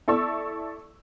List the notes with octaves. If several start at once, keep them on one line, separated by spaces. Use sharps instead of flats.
E4 A4 D5 C#6 E6